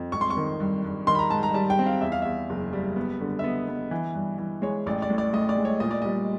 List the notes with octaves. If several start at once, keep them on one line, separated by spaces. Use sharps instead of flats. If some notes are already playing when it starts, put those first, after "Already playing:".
Already playing: F2
G#1 C#6
C6
C#6
D#3
G2
G2
D#3 C6
B5
A#5
G#2 A5
A#5
G3 A5
G5
C4
F5
E2 E5
F5
E2 E5
F#1
G3
B3
D3
E5
B3 D#5
B3
E3
G2
E3
G#3 C#5
A1 D5
D5
A2
D5
A2 D#5
D5
G#3
C#5
A#2 D#5
D5
G3 D#5